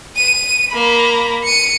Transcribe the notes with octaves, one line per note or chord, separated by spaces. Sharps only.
D#7
A#3 B5
C#7 D#7